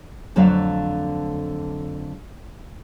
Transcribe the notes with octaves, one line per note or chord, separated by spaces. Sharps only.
F2 D3 F#3 A3 F#4 F5